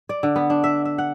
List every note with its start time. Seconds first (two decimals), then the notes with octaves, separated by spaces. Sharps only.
0.09 D5
0.23 D3
0.36 B3
0.50 D4
0.64 E5
0.85 E5
0.98 F#5